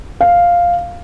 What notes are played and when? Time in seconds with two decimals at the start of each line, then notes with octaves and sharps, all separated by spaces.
0.21 F5